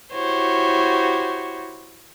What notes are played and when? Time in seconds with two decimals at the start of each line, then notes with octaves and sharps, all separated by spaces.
0.12 E4 F#4 G4 C5 C#5